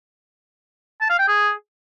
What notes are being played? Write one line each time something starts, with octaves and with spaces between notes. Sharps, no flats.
A5
F5
G5
G#4